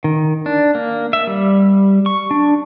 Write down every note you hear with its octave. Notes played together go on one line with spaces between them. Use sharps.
D#3
D4
A#3
E5
G3
C#6
D4